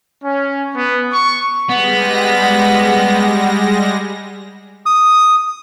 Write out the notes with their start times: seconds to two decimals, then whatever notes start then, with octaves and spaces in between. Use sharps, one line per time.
0.24 C#4
0.76 B3
1.13 C#6
1.69 G3 G#3 B3 F#5 A#6
4.86 D#6